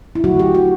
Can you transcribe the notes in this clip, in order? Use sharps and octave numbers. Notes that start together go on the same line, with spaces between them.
E4
D3 F#3 A3 F#4
G4
F#4